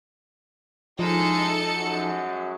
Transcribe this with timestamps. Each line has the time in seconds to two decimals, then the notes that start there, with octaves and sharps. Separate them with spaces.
0.99 F3 G#3 C#4 D#4 E4 A4 C#7
1.77 F#2 G#3 F#4